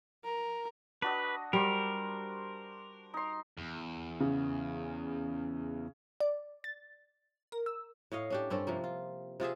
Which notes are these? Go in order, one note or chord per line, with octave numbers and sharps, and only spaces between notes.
A#4
D4 F#4 B4 D#5
G3 A#4 C5 D6
D#4 C6
E2
C#3
D5
A6
A#4
E6
A2 C#5 D#5 F5
C#4 D4 G4
G2 C4 C#4 A4
C3 F3 A#3
F4
C3 F4 G#4 E5